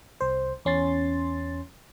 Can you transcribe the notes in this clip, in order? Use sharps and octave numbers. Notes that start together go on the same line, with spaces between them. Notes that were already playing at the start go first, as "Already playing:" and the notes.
C2 C5
E2 C#4 C6 A6